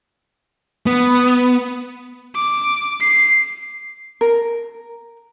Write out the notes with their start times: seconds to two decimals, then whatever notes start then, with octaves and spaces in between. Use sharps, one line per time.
0.86 B3
2.35 D6
3.01 C7
4.21 A#4